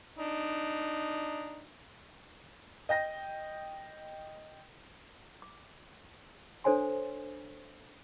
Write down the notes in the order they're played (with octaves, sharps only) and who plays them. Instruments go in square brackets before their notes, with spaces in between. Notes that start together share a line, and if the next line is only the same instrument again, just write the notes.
[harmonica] D4 D#4
[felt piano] D#5 G5 A#6
[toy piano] D6
D4 A4 C5 C#5 G#5 C6